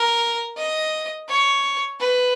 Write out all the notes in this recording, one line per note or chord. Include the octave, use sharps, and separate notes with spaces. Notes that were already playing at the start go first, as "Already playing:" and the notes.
Already playing: A#4
D#5
C#5
B4